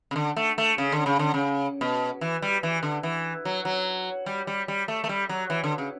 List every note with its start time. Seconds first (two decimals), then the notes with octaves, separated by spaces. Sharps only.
0.11 C#3
0.16 D3
0.36 A3
0.58 A3
0.78 C#3
0.92 D3
1.06 C#3
1.19 D3
1.34 C#3
1.81 B2
2.21 E3
2.42 G3
2.63 E3
2.83 D3
3.03 E3
3.45 F#3
3.65 F#3
4.26 G3
4.47 G3
4.68 G3
4.88 A3
5.04 A3
5.09 G3
5.29 F#3
5.50 E3
5.64 D3
5.78 C#3